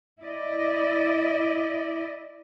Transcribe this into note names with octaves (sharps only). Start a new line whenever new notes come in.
E4 D5 D#5